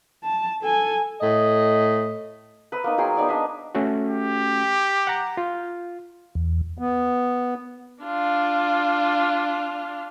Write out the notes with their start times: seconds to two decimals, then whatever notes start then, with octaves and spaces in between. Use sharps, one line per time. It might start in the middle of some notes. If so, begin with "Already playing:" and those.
0.23 A5
0.63 A4 G#5
1.21 A2 D#5
2.72 B4 E6
2.84 A#3 B3 D#4
2.98 F#3 G#4 G5 C6
3.17 B3 D#4 G#4 D5
3.29 D4 D#5 E5
3.75 A3 C#4 F#4
4.09 G4
5.07 F#5 A#5
5.37 F4
6.35 E2
6.78 B3
8.03 D4 F4